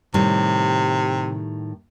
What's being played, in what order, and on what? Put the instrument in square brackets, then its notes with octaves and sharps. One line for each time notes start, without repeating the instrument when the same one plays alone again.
[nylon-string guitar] A2 D#3 G3 [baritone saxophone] C3